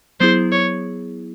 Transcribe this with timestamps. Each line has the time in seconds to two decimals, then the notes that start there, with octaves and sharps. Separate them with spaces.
0.20 F#3 B3 E4 G#4 C5
0.52 C#5